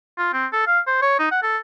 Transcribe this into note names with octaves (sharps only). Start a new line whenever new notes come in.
F4
C4
A4
F5
C5
C#5
D#4
F#5
A4